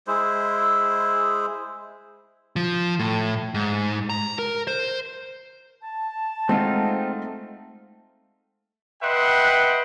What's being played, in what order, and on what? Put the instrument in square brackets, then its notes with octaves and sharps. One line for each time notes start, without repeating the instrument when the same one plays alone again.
[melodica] G#3 E4 C5
[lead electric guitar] F3
A2
G#2
A#5
A#4
C5
[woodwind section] A5
[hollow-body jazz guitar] G#3 F#5 [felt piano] A3 [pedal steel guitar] C4 D#4 F4
[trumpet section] B4 D#5 E5 F#5 G5 C6